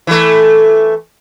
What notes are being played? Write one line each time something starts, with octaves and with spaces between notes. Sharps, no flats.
E3 A3